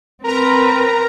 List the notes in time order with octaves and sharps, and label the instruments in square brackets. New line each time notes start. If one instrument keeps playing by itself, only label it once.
[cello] C4 B4 [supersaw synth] A#4 A#5